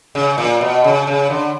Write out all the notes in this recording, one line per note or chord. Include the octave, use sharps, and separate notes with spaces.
C#3
A#2
B2
C#3
C#3
D3